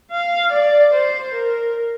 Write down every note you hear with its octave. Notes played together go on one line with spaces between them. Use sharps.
F5
D5
C5
A#4